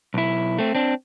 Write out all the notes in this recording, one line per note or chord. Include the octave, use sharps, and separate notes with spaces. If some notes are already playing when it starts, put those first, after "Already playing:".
B1 E4
A3 C4
C4 D4